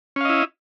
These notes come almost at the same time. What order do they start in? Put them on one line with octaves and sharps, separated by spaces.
C#4 F5 D#5 E4